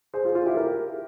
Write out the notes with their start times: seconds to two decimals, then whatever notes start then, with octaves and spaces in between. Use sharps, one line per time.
0.14 G#4 C5
0.25 F4 G#4
0.35 F4
0.46 E4 G4
0.57 G4 A#4